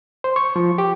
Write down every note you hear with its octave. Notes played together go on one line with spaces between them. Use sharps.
C5
C#6
F3
G4